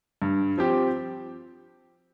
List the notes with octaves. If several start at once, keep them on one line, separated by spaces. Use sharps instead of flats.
G2
F3 C4 G4